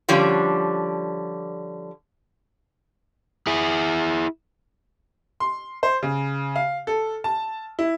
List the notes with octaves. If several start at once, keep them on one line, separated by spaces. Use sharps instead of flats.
D3 F3 G3 C#4
E4 G#4
C6
C5
C#3
F5
A4
A5
E4